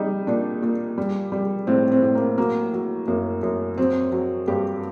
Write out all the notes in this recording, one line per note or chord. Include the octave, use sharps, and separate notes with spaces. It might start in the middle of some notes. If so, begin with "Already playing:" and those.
Already playing: G3 D#4
A#2 D4
A#2
G3
G3
A2 C4
C4
A2
A#3
F#3 A#3
F#3
F#2 A#3
F#2
F#3 C4
F#3
G2 G4